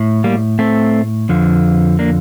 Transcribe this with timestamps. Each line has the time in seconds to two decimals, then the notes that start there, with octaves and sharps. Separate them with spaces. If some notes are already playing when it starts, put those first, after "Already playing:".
Already playing: A2
0.24 G3 A#3
0.59 A3 C4
1.29 F2 D3 F3
1.99 A#3 D4